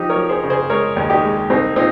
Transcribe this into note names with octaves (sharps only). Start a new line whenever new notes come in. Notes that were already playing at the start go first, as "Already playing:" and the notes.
Already playing: F3 D#4 G4
A#4 C#5
F3
G#4 C5
C#3
G#4 C5
G#3 A#4 C#5
D#2
D#4 G4
G#3
C2 C4 D#4
A#2 C4 D#4